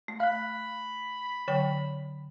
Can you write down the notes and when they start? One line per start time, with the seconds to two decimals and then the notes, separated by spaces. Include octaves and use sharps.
0.08 A3
0.20 F5 B5 F#6
1.48 D3 F#3 C#5 G5